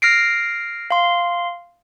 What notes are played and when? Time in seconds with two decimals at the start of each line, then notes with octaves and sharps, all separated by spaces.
0.02 F6 A#6 C7 D7
0.91 F5 C6